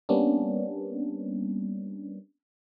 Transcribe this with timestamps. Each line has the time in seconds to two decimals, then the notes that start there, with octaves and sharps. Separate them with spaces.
0.09 G3 A#3 B3 C#4 D4